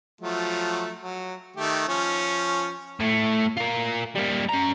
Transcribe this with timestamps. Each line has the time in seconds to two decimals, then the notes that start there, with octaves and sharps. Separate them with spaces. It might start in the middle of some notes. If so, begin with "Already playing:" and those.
0.21 F3 F#3 A3
1.01 F#3
1.56 D#3 A3 G4
1.88 F3 C#4
3.00 A2 A3
3.57 F4 A#4
4.16 G3 A#3
4.49 C#4 A#5